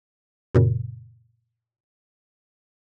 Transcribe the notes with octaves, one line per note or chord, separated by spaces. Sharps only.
F#2 A#2 C#3